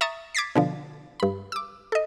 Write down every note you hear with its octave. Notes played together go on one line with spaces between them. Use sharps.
E5 A#5 C#6 D#6 A6
D6 G#6 A6 B6 C7
B2 D3 F3
G2 B5
D6 E6
A4 D#5